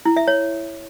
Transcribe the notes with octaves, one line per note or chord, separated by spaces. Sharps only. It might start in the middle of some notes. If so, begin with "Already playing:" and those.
E4
E5
C#5